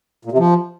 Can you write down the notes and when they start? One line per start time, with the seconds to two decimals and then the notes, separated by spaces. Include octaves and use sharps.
0.25 A#2
0.32 C3
0.38 F3